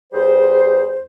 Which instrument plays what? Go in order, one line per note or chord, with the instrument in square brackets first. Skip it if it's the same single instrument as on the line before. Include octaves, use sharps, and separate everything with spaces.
[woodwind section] E2 G3 G#4 C5